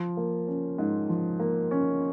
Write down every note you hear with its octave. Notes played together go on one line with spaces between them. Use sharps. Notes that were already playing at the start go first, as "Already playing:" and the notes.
Already playing: F3
A#3
C#4
G#2
F3
A#3
C#4